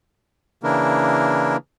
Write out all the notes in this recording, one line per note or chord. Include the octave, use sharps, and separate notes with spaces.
C#3 E3 A#3 D4 E4 A#4